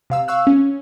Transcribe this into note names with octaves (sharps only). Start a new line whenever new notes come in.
C3 F5 E6
F5 C#6 E6 F#6
C#4